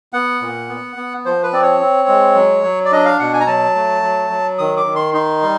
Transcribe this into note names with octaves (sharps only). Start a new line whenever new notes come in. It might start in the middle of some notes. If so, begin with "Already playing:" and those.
B3 F#5
A#2
B3
B3
F3 C5
B4
C4 D5
C#5
C4
G#3
F#3
F#3
D5
D4 D#5
F5
B2 F#5
G#5
A#5
F#3 A5
A3
F#3
F#3
D#3 D#6
D6
D#3
C6
D#4 C6
G3